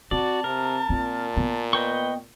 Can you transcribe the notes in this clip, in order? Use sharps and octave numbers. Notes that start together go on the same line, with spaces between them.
C4 F#4 D5 A5
C3 A#4
A#2 C4 F4
A#3 B3
B4 D#5 G5 C#6